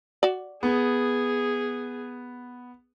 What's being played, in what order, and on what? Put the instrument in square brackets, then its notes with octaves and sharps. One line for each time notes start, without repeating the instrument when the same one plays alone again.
[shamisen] F#4 D5
[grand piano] B3 [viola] G#4